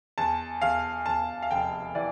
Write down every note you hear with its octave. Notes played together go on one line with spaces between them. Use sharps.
E2 A5
E2 F5
E2 A5
F5
F1 G5
E3 D5